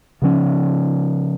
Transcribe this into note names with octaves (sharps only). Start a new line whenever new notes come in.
C#3 F3 C#4